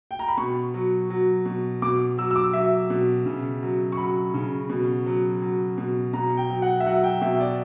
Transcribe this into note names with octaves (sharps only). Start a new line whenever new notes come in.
G5
A#5
B5
B2 C#6
F#3
F#3
B2
B2 D6
F#3 E6
E6
D6
F#3 E5
B2
C#3
F#3
C#6
F#3 B5
C#3
B2
F#3
F#3
B2
B2 A#5
G5
F#3
F#5
E5
F#3 F#5
G5
B2 E5
D5